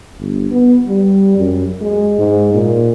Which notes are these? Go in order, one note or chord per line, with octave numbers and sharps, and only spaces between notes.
G1
B3
G3
F#2
G#3
G#2
A#2